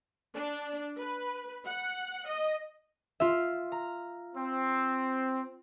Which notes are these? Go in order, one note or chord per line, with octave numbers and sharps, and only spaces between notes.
D4
B4
F#5
D#5
F4 E5
A#5
C4